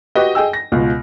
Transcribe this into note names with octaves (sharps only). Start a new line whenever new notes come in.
F#4 G4 B4 D#5
G#4 D#5 G5 G#5 E6
A#6
C#2 B2 F4